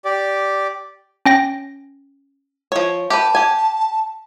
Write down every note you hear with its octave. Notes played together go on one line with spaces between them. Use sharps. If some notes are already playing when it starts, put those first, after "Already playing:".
G4 D5
C#4 G5 A#6
F3 C#5
G4 B4 A5
G4 G#5